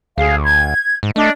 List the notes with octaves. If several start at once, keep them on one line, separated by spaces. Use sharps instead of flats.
D2 G#4 F5
G#6
G#2
A3 D4 D#5